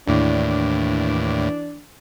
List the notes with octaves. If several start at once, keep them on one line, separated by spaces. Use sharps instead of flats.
D#2 A2 E3 D4